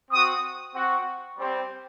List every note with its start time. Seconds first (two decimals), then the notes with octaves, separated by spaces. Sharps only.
0.11 C4 F#4 D#6
0.74 C4 F#4
1.37 G3 C4 G4